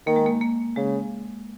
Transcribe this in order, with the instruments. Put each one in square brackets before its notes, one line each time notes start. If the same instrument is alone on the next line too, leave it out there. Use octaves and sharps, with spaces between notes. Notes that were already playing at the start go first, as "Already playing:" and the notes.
[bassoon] D#3 [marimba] A#3
[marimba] G#3
A#3
A#3
[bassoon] C#3 [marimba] G#3